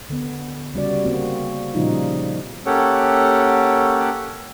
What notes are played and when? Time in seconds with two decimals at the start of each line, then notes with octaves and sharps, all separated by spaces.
0.10 D3 B3
0.74 C#3 G3 F#4 D5
1.05 A#3 C4 F#4
1.74 A#2 C#3 F3 G3 D#4 F4
2.66 A#3 C#4 G4 A4 C#5 F#5